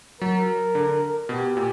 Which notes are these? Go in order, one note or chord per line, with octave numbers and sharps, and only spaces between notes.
F#3 A#4
D3
B2 G4
A#2